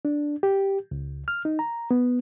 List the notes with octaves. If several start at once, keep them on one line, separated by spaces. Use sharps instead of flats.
D4
G4
C#2
F6
D#4
A#5
B3